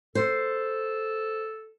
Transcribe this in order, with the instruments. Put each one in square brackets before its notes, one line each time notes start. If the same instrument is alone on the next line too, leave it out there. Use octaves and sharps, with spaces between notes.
[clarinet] A4 [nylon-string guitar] C5